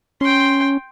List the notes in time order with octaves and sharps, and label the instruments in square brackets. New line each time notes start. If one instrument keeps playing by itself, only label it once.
[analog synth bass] C#4 [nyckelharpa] G5 C6